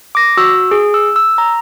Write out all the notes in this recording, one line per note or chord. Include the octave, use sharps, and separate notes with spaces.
D6 A#6
F#4 E6
G#4
E6
E6
A#5